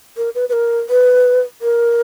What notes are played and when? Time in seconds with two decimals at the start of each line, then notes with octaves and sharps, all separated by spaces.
0.17 A#4
0.35 B4
0.49 B4
0.53 A#4
0.89 B4
1.61 A#4